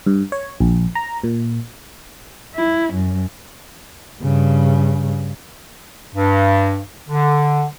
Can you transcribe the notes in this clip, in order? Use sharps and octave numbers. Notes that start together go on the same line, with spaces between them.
G2
C#5
A#1
A#5
A#2
E4
F#2
G2 C#3
G2
D3